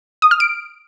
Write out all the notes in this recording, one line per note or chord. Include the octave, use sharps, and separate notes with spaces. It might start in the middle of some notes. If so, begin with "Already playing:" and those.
D#6
F6
D7